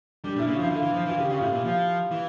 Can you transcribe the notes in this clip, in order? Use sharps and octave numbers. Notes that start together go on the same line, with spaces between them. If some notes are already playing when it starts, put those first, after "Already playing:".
G3 D4
A#2
E4
C#3
F4
F3
E4
D3 F4
E3
F3
E3 F4
C#3 G4
C#3 F4
A2 E4
A#2
F3 F4
E3